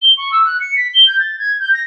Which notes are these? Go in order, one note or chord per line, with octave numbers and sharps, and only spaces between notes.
G7
C#6
E6
F#6
C#7
B6
G7
G6
A6
G#6
G6
A#6